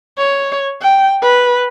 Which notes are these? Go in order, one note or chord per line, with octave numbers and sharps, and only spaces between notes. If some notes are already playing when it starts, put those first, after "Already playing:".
C#5
G5
B4